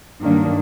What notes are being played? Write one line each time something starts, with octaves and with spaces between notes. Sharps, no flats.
G2 D#3 F#3 A#3 D4